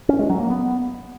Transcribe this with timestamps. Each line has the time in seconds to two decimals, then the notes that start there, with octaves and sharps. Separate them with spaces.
0.09 C#4
0.19 G#3
0.30 F#3
0.40 A#3
0.50 B3